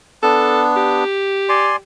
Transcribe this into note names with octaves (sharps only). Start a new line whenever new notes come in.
B3 D4 A4
G4
D5 G#5 C6